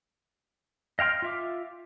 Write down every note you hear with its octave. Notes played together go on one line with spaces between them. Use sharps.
D#5 F5 G5 C6 F6
F4 E5 D6